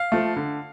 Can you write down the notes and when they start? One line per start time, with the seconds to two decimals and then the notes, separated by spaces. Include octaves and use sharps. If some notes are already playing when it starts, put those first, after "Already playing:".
Already playing: F5
0.12 F3 A3
0.36 D3